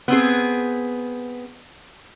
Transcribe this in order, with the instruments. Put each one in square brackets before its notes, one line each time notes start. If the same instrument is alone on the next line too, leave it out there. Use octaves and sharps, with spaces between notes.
[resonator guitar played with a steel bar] B3 C4 G#4